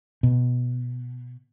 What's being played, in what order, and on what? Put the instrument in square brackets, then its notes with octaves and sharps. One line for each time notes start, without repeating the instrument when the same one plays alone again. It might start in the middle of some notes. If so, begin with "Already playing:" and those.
[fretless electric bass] B2